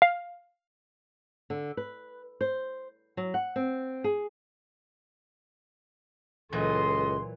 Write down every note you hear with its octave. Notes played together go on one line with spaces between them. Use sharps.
F5
D3
B4
C5
F#3
F#5
C4
G#4
C#2 A#2 E3 F#3 A4 D#5 C6